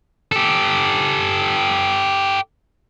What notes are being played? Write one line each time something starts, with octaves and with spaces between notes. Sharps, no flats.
G4 A4